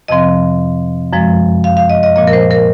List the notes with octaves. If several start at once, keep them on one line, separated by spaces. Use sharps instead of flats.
F2 C3 F3 C4 D#5
F#2 F3 G#3
F5
F5
D#5
D#5
A#2 F3 A#3 D#5
A#4
C5
A#4